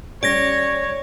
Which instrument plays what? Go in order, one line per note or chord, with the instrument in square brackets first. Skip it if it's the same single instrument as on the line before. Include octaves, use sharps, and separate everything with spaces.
[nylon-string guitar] G3 C#4 [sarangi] C#5 [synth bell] D5 G#6 A#6